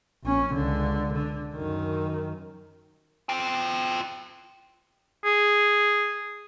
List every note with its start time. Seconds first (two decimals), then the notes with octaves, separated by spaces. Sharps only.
0.24 A#1 C#4
0.54 C#2 D3
1.13 D3
1.55 F#2 D#3
3.29 F4 G5
5.24 G#4